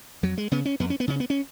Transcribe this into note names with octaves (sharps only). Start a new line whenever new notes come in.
F2 F#3
G#3
C#3 B3
C#4
F2 B3
C#4
B3
C#3 C#4
B3
C#4